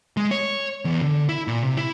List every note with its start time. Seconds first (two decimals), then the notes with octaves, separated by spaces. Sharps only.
0.17 G#3
0.31 C#5
0.85 E2
1.02 D3
1.29 E4
1.48 A#2
1.64 C3
1.77 E4